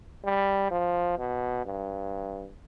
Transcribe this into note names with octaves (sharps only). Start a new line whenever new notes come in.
G3
F3
B2
G2